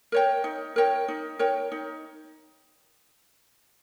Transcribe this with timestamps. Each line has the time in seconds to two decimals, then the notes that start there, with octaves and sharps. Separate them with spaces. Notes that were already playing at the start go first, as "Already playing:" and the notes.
0.12 A#4 C#5 G5
0.44 D#4
0.76 A#4 C#5 G5
1.08 D#4
1.39 A#4 C#5 G5
1.72 D#4